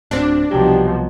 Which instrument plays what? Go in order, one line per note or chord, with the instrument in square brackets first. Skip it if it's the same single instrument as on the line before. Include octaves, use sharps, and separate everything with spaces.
[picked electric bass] D1 D2 C4 [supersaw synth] D4
[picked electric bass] C2 F#3 [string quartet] B2 F3 [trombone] G4